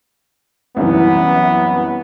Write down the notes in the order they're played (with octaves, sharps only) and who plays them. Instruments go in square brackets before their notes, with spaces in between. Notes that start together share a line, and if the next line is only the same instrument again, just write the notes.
[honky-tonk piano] C2 F#2 E3 [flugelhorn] B3